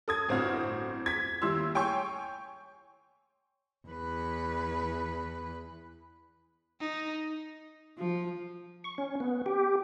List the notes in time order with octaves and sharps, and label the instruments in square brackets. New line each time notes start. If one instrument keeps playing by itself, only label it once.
[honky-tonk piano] A4 D#6 G#6
G1 A2 C4 E4 F#4 F6
G#6 B6
D#2 G3 E4 C6 E6
C#5 G5 G#5 C6 C#6
[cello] E2 B4
[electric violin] D#4
[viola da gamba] F3
[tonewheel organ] C#6
C#4
B3
G4